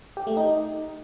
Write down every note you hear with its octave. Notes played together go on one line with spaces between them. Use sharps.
G4
A3
D#4